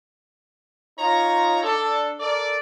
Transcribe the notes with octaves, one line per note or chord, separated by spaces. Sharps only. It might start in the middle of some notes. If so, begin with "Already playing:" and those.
D#4 F4 C#5 A#5
D4 A4
A4 A#4 D5